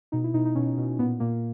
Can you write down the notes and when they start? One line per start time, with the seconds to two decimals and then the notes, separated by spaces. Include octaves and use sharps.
0.12 B2 D#4
0.24 E4
0.34 B2 D#4
0.46 D#4
0.55 B2 C#4
0.77 B2
0.99 A#2 B3
1.20 A#2 A#3